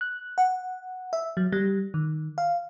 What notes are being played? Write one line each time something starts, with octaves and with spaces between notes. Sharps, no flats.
F#6
F#5
E5
F#3
G3
D#3
F5